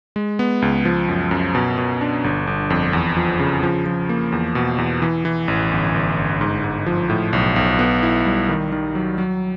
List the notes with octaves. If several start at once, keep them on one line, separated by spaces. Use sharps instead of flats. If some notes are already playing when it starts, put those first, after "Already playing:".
G#3
B3
C#2
F3
F#2
F#2
B2
B2
D4
G1
G1
F2
E2
F3
C#3
F3
F3
A#3
E2
B2
E2
E3
E3
A1
G1
G1
G1
G#2
G#2
F3
A2
B1
B1
B3
E4
G3
D#3
D#3
F#3
F#3